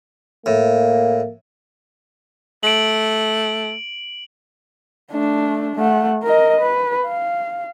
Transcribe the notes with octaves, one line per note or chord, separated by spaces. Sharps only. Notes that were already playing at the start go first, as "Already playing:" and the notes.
A2 A#3
A3 D7 F#7
A3 D4
A3 F#5
A#4 D#5
B4
F5